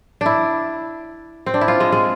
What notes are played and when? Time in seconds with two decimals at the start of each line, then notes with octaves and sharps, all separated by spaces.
0.21 D4 E4
1.46 C4
1.54 D4
1.61 E4
1.68 F4
1.80 G#3
1.92 G#3